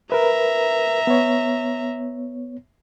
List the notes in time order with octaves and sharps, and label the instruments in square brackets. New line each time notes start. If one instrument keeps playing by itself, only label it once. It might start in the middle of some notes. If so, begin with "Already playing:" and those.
[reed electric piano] A#4 B4 [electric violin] E5 A#5
[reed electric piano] B3 C#5